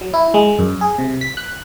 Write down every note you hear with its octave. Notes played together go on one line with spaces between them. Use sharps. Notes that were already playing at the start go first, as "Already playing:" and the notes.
F#3
E4
G#3
F#2
G#4
C3
B6
F#6